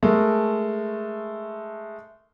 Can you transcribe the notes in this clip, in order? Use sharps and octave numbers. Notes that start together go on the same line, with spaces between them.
G#3 A3 A#4